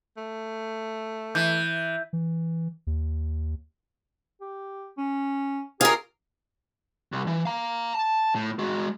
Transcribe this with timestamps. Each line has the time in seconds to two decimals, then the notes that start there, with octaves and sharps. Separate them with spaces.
0.17 A3
1.35 E3 G6
2.13 E3
2.87 D#2
4.41 G4
4.98 C#4
5.81 F4 G4 G#4 A#4
7.12 C2
7.27 E3
7.45 F5 A#5
7.94 A5
8.35 A2
8.59 G#3 F#4